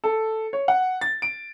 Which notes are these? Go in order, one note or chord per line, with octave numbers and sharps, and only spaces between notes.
A4
C#5
F#5
A6
D7